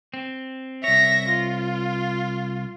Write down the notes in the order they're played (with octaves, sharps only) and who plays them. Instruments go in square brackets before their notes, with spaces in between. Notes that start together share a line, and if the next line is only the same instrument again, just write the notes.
[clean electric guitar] C4
[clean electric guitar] C2 C#5 [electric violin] E5 A#6
[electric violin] F4